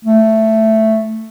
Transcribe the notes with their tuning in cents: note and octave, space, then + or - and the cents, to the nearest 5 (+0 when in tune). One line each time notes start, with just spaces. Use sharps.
A3 +5